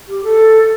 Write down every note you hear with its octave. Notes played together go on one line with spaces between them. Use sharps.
G4
A4